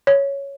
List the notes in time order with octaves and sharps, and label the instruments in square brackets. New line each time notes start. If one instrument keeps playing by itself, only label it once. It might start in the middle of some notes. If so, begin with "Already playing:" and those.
[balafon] C#5